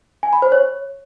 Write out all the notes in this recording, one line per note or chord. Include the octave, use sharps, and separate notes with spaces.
G#5
B5
C5
C#5